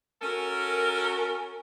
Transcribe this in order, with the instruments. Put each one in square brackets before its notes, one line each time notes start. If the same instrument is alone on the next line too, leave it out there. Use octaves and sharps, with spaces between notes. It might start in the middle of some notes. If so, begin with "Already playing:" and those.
[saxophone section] C#4 F#4 A4 A#4